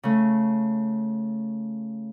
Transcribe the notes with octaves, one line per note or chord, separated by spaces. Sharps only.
C#3 A3